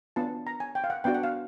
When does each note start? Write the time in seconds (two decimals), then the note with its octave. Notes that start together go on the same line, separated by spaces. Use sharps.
0.16 B3 D4 F4 A5
0.47 A#5
0.60 G#5
0.75 G5
0.84 F5
0.90 F#5
1.04 B3 D4 F#4 G5
1.15 F#5
1.23 F5